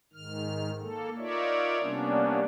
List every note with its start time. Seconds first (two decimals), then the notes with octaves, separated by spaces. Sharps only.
0.13 G#2 D#3 F6
0.81 A#3 A4
1.18 D#4 F4 A#4 C#5 D5 E5
1.81 C3 G3 A#3 B3 C#4 D4